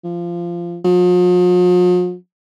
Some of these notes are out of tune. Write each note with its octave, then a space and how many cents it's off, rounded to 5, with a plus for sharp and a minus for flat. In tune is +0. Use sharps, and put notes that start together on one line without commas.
F3 -15
F3 +45